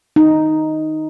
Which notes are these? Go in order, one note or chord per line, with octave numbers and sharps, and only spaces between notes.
D#4